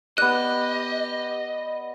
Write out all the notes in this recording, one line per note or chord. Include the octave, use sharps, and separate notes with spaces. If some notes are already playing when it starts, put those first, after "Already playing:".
B3 G4 D5 D#5 F#6